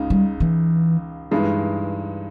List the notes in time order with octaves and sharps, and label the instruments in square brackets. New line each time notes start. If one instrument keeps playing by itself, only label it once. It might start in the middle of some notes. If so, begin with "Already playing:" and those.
Already playing: [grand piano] C#2 C#3 G#3 D#4
[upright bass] G3
E3
[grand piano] G2 E3 G#3 D#4